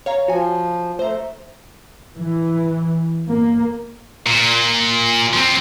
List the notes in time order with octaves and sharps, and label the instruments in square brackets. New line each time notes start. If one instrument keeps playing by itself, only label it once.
[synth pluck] C#5 F5 A#5
[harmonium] F3 [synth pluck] F#4 G#5
[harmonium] A3 [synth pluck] C5 A#5
[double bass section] E3
A#3
[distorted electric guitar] A#2
F3 C4